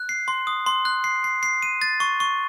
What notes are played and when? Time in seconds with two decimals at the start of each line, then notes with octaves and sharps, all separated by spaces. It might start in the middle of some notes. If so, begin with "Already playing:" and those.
Already playing: F#6
0.09 C7
0.28 C6
0.47 D#6
0.66 C6
0.85 F#6
1.04 C7
1.24 C7
1.43 C7
1.62 D#7
1.82 A6
2.00 C#6
2.20 C#6